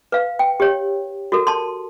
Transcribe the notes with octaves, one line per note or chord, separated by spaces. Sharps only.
B4 F5
G5
G4 C#5
F#4 A4 A#4
A5 C6